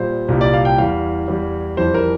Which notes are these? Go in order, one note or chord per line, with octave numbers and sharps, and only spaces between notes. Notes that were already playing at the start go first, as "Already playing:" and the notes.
Already playing: A#2 G3 C5
C2 A#2 G3
D5
F5
G5
E2 E3 G3 F5
E2 E3 G3
F2 E3 G3 C5
A#4